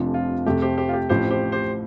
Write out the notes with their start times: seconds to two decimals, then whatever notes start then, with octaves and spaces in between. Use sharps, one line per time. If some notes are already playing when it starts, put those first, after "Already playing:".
Already playing: F1 F2 C3 F3 D4
0.14 F4
0.46 F2 C3 A3 G4
0.62 G4 C5
0.77 G4 C5
0.89 F4
0.93 G4
1.09 A1 A2 F3 C4 G4 C5
1.30 G4 C5
1.52 G4 C5